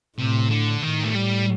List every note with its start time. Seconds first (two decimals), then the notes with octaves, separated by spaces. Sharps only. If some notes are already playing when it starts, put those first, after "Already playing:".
0.18 A2 C3
0.50 D3
0.83 A2 D#3
1.05 A3
1.15 G3